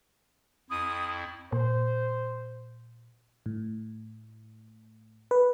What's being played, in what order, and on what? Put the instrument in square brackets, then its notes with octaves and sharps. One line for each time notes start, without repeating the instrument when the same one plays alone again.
[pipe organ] F2 E4 [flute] D#6
[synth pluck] A#2 [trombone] C5
[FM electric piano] A2
B4